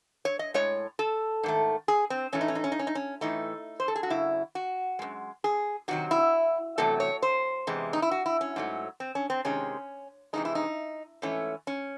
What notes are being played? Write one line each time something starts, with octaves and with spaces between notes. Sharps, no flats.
C#5
D#5
A2 G#3 C#5
A4
G#2 D#3 A3
G#4
C4
A2 E3 A3 C#4
D#4
C#4
D#4
C#4
D#4
C#4
D#4
C#4
A2 E3 A3 D#4
C5
A4
G#4
F#4
F#2 C#3 E4
F#4
F#2 C#3 G#3
G#4
C3 D#3 F#3 F#4
E4
E2 C3 F#3 A3 A4
C#5
C5
E2 C3 E3 G#3
D#4
E4
F#4
E4
C#4
G#2 F#3 A3
C4
C#4
C4
C3 D#3 G#3 C#4
C3 E3 G#3 D#4
E4
D#4
G#2 E3 A3 C#4
C#4